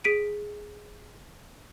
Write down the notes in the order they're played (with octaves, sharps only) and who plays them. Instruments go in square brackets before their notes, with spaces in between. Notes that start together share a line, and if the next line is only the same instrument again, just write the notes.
[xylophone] G#4 B6 D7 D#7